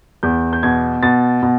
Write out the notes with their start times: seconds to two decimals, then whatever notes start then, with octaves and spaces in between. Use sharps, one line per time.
0.23 E2 G6
0.53 G6
0.63 B2 G#6
1.03 B2 A6
1.43 B2